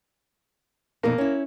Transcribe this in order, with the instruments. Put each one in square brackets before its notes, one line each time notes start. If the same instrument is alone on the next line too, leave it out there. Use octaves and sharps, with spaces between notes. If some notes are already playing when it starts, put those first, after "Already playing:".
[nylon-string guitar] F2 B2 D#4 [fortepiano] A#3
[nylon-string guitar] C#4 E4